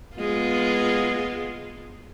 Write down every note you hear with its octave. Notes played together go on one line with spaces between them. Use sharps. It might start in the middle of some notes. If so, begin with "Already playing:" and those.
G#3 B3 F4